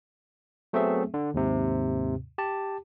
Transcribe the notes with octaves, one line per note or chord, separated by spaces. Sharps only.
F#3 A3 B3 C4 G#4 E5
D3
D#2 G#2 C3
G4 A5